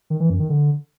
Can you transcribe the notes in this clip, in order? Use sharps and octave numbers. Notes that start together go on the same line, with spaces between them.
D#3
E3
F#2
D#3
D3